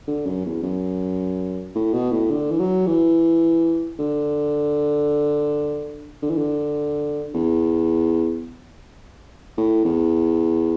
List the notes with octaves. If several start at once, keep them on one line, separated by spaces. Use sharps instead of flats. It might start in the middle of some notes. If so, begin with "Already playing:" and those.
D3
F#2
E2
F#2
A2
B2
A2
D3
E3
F#3
E3
D3
D3
E3
D3
E2
A2
E2